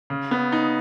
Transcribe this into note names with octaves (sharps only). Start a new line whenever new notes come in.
C#3
B3
D#4